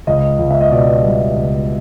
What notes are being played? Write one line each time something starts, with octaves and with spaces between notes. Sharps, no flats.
C#2 D#5
C#2
E5
D#5
B2 D5
G3
C#2